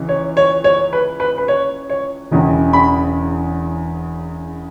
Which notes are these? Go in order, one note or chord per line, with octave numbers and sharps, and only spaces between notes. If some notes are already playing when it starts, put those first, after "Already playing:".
Already playing: C#2 C#3 E3
C#5
C#5
C#5
B4
B4
B4
C#5
C#5
E1 E2 C#3
B5